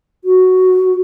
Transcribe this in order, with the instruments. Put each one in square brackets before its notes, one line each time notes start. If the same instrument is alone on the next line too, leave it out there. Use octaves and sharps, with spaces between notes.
[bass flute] F#4